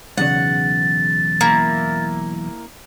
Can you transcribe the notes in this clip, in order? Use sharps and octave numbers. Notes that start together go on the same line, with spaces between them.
B1 E2 C#3 F#5 A6
A#3 E4